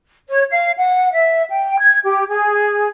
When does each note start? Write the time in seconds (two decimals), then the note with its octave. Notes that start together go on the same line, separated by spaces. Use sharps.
0.28 C#5
0.50 F5
0.78 F#5
1.13 E5
1.50 G5
1.79 G#6
2.04 G4
2.29 G#4